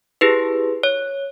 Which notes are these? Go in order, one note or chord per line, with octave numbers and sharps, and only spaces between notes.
E4 G4 G#4 B4
C#5